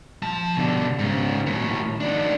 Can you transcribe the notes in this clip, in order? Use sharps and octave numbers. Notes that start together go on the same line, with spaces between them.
F3 A5
B2 D3
G#2 C#3
D#2 A2
D#3 D4